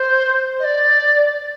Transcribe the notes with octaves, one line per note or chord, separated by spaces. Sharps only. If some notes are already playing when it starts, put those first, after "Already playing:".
Already playing: C5
D#5
D5